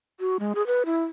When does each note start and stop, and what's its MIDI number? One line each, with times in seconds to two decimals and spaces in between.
0.20 0.37 66
0.39 0.53 56
0.55 0.65 68
0.67 0.83 71
0.85 1.04 64